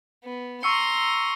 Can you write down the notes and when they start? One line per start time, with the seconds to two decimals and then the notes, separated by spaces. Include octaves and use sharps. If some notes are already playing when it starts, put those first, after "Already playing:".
0.24 B3
0.63 A#5 C6 C#6 E6 C#7